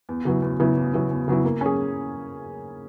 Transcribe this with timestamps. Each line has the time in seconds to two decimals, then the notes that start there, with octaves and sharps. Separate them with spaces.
0.09 E2
0.25 C#3 F#3 B3 E4
0.42 E2
0.60 C#3 F#3 B3 E4
0.77 E2
0.94 C#3 F#3 B3 E4
1.11 E2
1.28 C#3 F#3 B3 E4
1.45 A#3
1.61 C#4 G#4